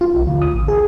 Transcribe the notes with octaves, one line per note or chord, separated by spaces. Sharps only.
F4
B1
D2
D#6
A1
G#4